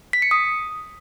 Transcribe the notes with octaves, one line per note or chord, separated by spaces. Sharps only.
B6
C#7
D#6